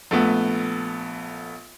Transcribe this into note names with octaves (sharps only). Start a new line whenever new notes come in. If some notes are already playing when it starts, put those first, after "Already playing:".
A#1 A3 B3